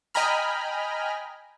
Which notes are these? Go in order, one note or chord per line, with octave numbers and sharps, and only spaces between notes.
D#5 G5 G#5 A#5 B5 F6